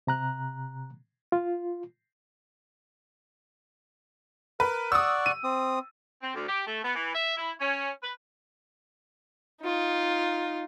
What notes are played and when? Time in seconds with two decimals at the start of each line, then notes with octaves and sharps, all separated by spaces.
0.07 C3 A#5 F#6
1.32 F4
4.60 A#4 B4
4.92 D5 F#5 C#6 D#6 E6
5.26 D#7
5.44 C4 D#6
6.23 C4
6.35 D2
6.48 G4
6.67 A3
6.84 B3
6.95 E3
7.15 E5
7.37 E4
7.60 C#4
8.03 B4
9.62 D#4 F4